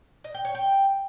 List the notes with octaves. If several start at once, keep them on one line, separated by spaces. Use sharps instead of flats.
D#5
G5
C#5
G5